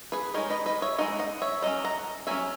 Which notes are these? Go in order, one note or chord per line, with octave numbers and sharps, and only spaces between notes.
G#4 B4
G#3 D#4 A#4 C#5
B4 D#5
B4 D#5
C#5 E5
G#3 D#4 D#5 F#5
D#5 F#5
C#5 E5
F#3 C#4 D#5 F#5
F#5 A#5
F#3 C#4 E5 G#5